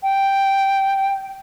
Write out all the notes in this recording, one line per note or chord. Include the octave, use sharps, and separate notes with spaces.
G5